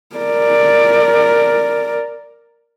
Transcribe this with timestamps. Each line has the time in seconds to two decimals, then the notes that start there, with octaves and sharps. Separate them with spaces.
0.16 A#4 D5